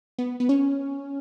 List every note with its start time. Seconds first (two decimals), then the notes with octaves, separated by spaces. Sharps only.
0.18 B3
0.40 B3
0.49 C#4